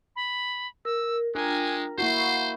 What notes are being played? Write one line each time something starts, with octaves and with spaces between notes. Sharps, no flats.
B5
A#4 E6
G#3 D4 F4 A#4 G5 G#5
A#3 E4 F#4 C5 F#5 A#5 C#6 C7